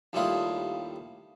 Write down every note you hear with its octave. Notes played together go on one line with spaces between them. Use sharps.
D#2 A2 G3 E4 F4 D#6